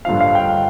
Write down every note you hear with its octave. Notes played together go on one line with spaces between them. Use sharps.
G2 D3 F3 F5
F5
G5